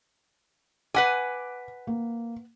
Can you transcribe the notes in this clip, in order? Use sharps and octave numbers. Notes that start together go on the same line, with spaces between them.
B4 F#5 G#5 D6 B6
A#3